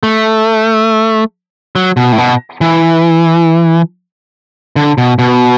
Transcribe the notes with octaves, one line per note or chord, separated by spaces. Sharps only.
A3
F#3
B2
A2
B2
E3
D3
B2
B2